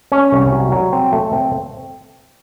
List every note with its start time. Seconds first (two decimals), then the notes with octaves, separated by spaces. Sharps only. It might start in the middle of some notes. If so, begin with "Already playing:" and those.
0.12 C#4
0.32 C2
0.52 F#3
0.72 F#3
0.92 C4
1.12 A3
1.32 C4